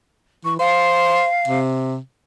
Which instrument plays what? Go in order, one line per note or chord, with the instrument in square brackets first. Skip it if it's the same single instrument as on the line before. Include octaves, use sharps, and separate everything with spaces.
[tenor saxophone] E3 [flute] C#6
[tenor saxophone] C5 [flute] F5
[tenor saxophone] C3